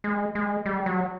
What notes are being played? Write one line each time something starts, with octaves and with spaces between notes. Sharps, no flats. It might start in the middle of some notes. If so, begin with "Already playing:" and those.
G#3
G#3
G3
F#3